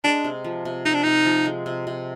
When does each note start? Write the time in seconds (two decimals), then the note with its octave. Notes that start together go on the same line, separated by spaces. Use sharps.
0.04 G#3 D4
0.24 C3
0.44 F3
0.65 C3
0.85 C3 D#4
0.94 D4
1.03 C3 D#4
1.25 F3
1.45 G#3
1.66 C3
1.87 C3